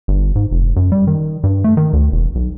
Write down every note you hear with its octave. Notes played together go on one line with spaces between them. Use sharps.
G1
G#2
F1
F#2
G3
D#3
G2
A3
D#3
D2
E1
B1